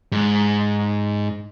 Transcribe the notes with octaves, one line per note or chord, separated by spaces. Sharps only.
G#2